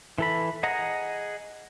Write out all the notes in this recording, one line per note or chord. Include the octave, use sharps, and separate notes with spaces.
E3 A4 B5
G#4 D#5 F#5 A#5